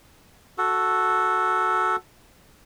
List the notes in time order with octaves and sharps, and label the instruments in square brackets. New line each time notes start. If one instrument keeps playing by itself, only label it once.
[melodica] F#4 A4